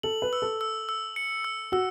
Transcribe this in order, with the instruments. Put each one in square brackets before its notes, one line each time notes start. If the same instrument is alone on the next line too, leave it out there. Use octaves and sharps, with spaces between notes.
[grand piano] A4 [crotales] F#7
[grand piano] B4
[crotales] E6
[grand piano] A4
[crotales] E6
E6
C#7
E6
[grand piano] F#4 [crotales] E6